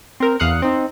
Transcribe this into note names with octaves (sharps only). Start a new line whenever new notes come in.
C4 A#4
E2 F5 D#6 F#6 C#7
C4 D#4